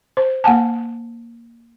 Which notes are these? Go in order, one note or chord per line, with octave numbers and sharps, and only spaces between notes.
C5
A#3 F#5 G#5 A5